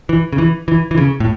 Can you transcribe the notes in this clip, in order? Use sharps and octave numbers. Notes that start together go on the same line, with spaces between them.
E3
C#3
E3
E3
E3
C#3
A2